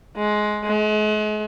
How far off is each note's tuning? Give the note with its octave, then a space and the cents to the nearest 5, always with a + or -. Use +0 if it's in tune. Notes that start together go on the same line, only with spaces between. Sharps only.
G#3 +15
G#3 +40